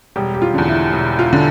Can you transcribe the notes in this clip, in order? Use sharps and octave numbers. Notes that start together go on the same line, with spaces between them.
E1 G3 G4
G4
F4
E2 D3
E4
E1
F4
D3